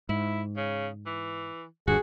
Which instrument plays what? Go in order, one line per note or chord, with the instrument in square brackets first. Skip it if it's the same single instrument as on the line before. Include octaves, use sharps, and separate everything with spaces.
[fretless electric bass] G#2 [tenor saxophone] E4
[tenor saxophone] C#3
E3
[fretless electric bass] D#1 G2 D3 [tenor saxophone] F#4 [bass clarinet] G#4